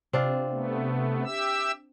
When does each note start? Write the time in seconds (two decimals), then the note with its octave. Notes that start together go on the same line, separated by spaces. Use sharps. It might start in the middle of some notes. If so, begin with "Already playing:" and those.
0.13 C3 C4 D4 F4
0.50 A3 B3
1.25 G4 E5 E6